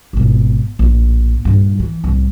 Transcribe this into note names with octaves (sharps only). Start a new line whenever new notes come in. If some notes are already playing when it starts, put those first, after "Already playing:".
G#1 B2
A#1 A2
G2 A#2
E3
C2 A2